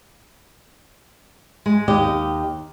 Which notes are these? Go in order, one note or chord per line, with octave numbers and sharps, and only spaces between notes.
G#3
D#2 G4 D#5